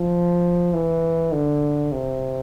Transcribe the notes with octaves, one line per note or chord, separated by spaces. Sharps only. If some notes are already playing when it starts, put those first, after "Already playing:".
Already playing: F3
E3
D3
C3